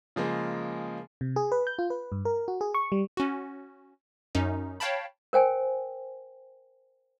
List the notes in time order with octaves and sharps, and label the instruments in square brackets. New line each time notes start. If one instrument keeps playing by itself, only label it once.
[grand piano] C#3 F3 G#3 A#3
[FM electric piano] C3
G#4
B4
G6
F4
B4
G2
A#4
F#4
G#4
C#6
G3
[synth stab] C#4 F#4
F#2 C#4 D#4
C#5 F5 G5 A5 B5
[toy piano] A#4 C5 G5 G#5